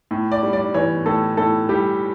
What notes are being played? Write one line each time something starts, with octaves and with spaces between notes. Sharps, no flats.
A2
D5
G3
D5
E3 C#5
A2 A4
A2 A4
G3 G4